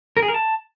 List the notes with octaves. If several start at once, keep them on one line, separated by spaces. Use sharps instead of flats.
A#4
G#4
A#4
A5